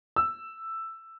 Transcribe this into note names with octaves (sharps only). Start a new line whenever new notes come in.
E6